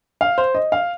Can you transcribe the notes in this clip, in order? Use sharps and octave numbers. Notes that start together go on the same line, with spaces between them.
F5
C5
D#5
F5